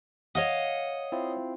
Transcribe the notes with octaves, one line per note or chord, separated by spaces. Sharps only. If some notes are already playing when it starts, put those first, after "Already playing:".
C#5 D#5 F5 F#5
C4 E4 F4